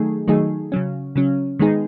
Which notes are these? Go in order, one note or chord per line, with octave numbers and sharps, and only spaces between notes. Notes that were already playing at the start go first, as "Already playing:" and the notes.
Already playing: D#3 F#3 A3 D#4 G#4
D#3 F#3 A3 D#4 G#4
C#3 F#3 C#4
C#3 F#3 C#4
D#3 G#3 B3 D#4 G#4